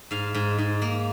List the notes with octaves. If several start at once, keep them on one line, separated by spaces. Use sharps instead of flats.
G#2 F5
G#2
G#2
A#3